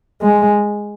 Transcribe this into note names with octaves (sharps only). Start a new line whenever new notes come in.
G#3